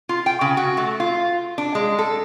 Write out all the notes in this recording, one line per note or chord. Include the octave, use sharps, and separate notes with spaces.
F4
G5
C#3
F#4
A3
F4
D4
G#3
A4